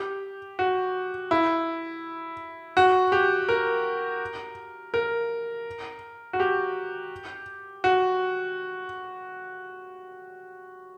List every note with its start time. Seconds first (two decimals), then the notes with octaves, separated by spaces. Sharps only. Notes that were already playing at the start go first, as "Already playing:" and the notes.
Already playing: G4
0.59 F#4
1.31 E4
2.77 F#4
3.12 G4
3.49 A#4
4.94 A#4
6.33 F#4
6.40 G4
7.84 F#4